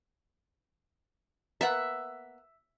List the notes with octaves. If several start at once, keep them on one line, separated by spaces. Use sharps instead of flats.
A#3 B3 E5 F#5